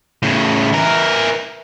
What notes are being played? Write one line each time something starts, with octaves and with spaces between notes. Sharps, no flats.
A2 C#3
E3 A#4